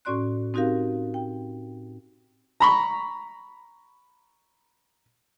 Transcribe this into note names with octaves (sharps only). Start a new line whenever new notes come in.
A2 C#4 F#4 D5 C6 F#6
C4 D#4 F#4 G4 A#4 F5
G5
A#5 B5 C#6